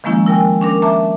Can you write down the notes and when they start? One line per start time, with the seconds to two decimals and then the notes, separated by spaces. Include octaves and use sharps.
0.04 D#3 F3 G#3 A#3 C#4 E4
0.26 E4 A#4 G5 G#5
0.61 C#4 D4 A#4
0.82 E5 A5 A#5 D6